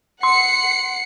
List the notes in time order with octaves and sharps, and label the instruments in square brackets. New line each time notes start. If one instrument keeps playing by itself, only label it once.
[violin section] F#5 C7 C#7 [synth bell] C6